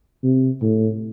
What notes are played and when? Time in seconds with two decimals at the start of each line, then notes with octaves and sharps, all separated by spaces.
0.24 C3
0.62 A2